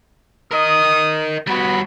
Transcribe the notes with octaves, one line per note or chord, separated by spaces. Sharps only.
A#4 D#5 D#6
G3 B3 F#4 B5